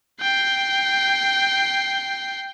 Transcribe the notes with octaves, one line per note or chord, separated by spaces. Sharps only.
G5 C7